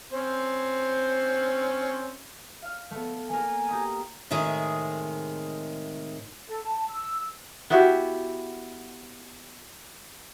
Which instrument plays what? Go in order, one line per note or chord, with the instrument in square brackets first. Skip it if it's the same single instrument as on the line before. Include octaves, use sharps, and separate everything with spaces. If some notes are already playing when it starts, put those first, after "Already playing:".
[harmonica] C4 C#4 C5
[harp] F5 F6
A3 B3
[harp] A#3 A#4 [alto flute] G#5
[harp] G4 A#5 D#6
[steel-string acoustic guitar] A2 C3 D#3 G#3 G#4
[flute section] A4
A5
E6
[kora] B3 E4 F#4 G4